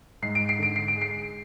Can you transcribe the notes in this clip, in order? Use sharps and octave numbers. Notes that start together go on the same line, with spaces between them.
G#2 C7
D7
C7
D3 D7
C7
D7
G#3
C7